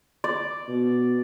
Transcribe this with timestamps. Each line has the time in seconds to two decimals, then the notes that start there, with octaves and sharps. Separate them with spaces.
0.24 D5
0.68 B2